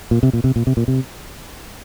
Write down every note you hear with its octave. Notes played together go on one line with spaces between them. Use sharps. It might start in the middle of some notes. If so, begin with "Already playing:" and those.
A#2
C3
A#2
C3
A#2
C3
A#2
C3